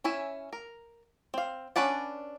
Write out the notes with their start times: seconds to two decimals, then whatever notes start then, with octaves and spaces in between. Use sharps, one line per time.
0.04 C#4 E4 E5 G#5
0.53 A#4
1.34 C4 F5
1.76 C#4 D4 B4 D5 F#5